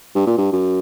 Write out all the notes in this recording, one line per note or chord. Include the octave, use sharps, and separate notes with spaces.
G2
A#2
G2
F#2